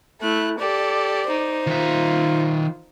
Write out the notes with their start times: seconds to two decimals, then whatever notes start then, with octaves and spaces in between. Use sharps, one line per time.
0.21 A3 E4 F#6
0.59 G4 A4 D5
1.27 D#4 C5
1.67 D#3 F4 E5